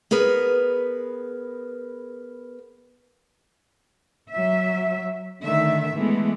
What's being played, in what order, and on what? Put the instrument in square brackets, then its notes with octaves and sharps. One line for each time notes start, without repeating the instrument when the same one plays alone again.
[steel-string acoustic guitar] B3 G#4 A#4 B4
[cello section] F#3 E5
D3 D#3 A3 E5
E3 G#3 A3 B3